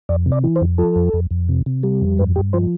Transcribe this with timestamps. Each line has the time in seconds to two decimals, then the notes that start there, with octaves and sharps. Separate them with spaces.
0.09 F2 D5
0.26 C3
0.32 D5
0.44 E3
0.56 C5
0.62 F2
0.78 F3 A4
0.96 F2
1.13 F2
1.31 F2
1.49 C3
1.66 C3
1.83 G3
2.01 F2
2.18 G2 B4
2.36 G2 G4
2.53 F3 C5